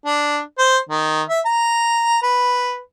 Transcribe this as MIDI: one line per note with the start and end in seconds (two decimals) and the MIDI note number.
0.06 0.40 62
0.59 0.77 72
0.89 1.22 51
1.29 1.40 76
1.46 2.22 82
2.22 2.79 71